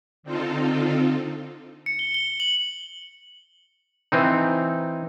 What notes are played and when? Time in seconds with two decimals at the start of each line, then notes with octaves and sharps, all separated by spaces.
0.23 D3 C4 D#4 F4 A4
1.86 C#7
1.99 G7
2.14 G7
2.28 G7
2.40 F#7
4.12 E3 C4 D#4